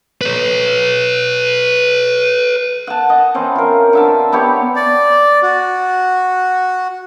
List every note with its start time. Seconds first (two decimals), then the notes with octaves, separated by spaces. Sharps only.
0.21 B4 C#5
2.87 F#5 A5
3.10 D#5
3.34 E3 C4 C#4
3.56 F4 A#4
3.93 D3 E5 A5
4.32 B3 E4 G4 C#5
4.76 D5
5.43 F#4